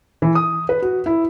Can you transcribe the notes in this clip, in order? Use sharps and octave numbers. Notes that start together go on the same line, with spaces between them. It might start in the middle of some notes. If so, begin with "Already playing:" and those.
E3
D#6
B4
F#4
E4